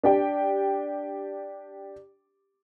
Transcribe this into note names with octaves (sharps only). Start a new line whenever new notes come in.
D4 G4 G5